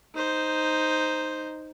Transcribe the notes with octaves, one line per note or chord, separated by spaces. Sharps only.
D#4 C5